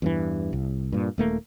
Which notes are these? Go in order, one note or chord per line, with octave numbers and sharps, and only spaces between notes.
E2 G2 E3
C2
G2 A#2
D#1 A3 A#3